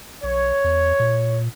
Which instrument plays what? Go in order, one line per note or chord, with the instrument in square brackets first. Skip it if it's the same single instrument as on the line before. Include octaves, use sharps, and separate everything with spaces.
[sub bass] B1 [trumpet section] C#5
[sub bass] E2
A#2